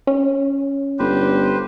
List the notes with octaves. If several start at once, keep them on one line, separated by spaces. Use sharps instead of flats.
C#4
G1 G4 B4 C5